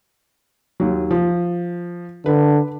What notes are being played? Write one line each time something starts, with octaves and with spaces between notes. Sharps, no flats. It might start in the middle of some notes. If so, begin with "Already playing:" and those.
D#2 F#3
F3
D3 B4